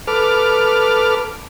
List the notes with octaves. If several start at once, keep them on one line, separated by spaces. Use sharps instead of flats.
A4 B4 D6 F6